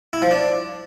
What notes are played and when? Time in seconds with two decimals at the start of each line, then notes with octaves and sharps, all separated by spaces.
0.13 E4
0.22 F3
0.31 D4